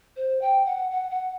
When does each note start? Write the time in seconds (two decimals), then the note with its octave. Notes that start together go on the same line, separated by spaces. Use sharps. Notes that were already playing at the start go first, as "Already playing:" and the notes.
0.16 C5
0.41 G5
0.66 F#5
0.91 F#5
1.11 F#5